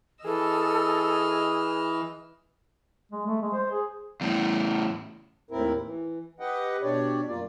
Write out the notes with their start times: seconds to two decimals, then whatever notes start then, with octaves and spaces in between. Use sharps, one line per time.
0.25 E3 G#4 A4 D#5 E6 F6
3.11 G#3
3.27 A3
3.42 G#3
3.54 C5
3.71 G#4
4.21 E2 A2
5.51 D#2 A2 C4 E4 A#4
5.84 E3
6.40 G4 B4 D#5 F#5 G5
6.82 B2 D4 G4 C#5 D5
7.28 F#2 A#3 F4 D5